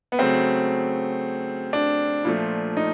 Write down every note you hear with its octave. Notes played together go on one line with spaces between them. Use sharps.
B3
C#3 F#3 A3 C4
D4
A#2 F3 A3
D#4